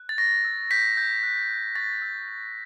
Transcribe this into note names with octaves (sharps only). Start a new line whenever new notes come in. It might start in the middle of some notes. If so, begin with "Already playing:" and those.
Already playing: F#6
A6
C#6 A#6
E6
G6 B6
G6
F#6
F#6
C#6 A6
E6
G6